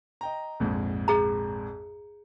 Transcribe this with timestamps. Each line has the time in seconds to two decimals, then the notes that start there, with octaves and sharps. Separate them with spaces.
0.21 D#5 G5 A#5
0.60 A#1 F2 G#2
1.08 G#4 A#5